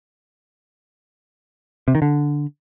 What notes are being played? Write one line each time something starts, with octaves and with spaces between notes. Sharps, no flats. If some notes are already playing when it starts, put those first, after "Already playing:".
C3
D#3
D3